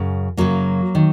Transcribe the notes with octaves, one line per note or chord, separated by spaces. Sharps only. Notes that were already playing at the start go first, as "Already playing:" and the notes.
Already playing: F#2 C#3
F#2 C#3 F#3 A#3
D#3